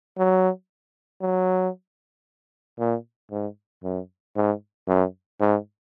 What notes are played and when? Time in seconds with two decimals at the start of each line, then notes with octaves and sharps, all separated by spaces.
0.18 F#3
1.21 F#3
2.79 A#2
3.31 G#2
3.83 F#2
4.36 G#2
4.88 F#2
5.40 G#2